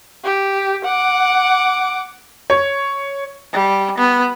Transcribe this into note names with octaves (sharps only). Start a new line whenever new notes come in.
G4
F#5 D6
C#5
G3
B3